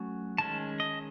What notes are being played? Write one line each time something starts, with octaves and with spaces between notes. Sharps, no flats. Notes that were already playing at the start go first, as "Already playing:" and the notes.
Already playing: F#3 A3 C#4
D#3 G#3 C#4 A5
D#5